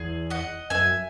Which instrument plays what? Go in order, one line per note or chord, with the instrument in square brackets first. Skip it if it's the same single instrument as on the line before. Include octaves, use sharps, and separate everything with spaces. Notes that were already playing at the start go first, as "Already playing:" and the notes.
Already playing: [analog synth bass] E2 [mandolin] G#4
[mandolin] D#5 F#5
[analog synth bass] F#2 [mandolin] E5 G#5